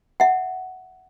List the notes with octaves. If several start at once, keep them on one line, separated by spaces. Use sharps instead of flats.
E5 F#5